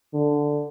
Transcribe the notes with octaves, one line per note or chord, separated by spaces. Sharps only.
D3